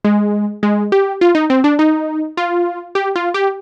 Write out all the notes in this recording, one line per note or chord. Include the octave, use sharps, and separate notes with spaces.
G#3
G#3
G4
F4
D#4
C4
D4
D#4
F4
G4
F4
G4